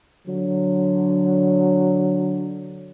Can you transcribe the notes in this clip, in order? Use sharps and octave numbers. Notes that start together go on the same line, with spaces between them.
D3 F#3